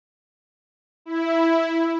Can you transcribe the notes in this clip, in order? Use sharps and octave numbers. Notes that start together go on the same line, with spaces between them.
E4